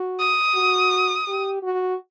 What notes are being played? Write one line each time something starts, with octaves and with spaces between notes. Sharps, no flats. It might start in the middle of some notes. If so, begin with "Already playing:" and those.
Already playing: F#4
D#6
F#4
G4
F#4